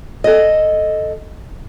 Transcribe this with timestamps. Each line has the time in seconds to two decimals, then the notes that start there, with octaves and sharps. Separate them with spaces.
0.24 A4 D#5